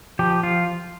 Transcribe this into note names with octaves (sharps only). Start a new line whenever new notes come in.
F3 G4
F4